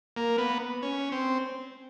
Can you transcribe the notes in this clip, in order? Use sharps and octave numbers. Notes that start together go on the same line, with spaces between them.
A#3
B3
C#4
C4